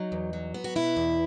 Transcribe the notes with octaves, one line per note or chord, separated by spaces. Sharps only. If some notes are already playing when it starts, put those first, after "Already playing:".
Already playing: F#3 D#4
E2
F#3
B3
F#4
B2 E4
E2